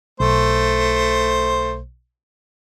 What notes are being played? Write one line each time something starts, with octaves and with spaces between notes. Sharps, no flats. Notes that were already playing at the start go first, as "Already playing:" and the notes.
B1 A3 C5